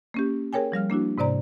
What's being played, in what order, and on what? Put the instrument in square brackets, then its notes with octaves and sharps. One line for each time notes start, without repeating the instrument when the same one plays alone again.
[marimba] A#3 C#4 G4
G#4 A#4 C#5 G5 G#5
F3 G3 F5 F6
A#3 D4 E4 F#4
G#2 C3 C5 D5 A#5